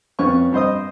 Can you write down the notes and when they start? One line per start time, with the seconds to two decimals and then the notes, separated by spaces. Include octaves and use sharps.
0.19 F2 B3 C#4 C#6
0.52 G2 C5 D#5 D#6